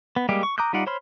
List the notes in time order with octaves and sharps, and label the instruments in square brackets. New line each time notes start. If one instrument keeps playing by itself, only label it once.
[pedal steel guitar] B3
G3 G#3 A#3 G4
C#6
A#5 D6 D#6 F#6 G6
G3 D#4 F4 D5 F#5
C5 C#5 B5 C6 F6